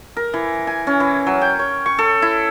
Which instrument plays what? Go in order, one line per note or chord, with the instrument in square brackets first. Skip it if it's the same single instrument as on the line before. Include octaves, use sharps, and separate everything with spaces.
[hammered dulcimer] A#4
E3
G#5
C#4
E3
F#3
G5
C#5
C#6
A4
E4